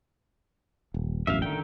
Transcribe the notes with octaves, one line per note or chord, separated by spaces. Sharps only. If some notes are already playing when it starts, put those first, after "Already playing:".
D#1
E1 A1 F#2 E5 F5
D3 D#3 G5